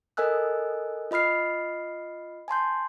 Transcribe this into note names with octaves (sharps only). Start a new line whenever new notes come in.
A4 A#4 D#5 G#5 E6 F#6
F4 D#5 B5 F6 C7
G#5 A5 C6 G6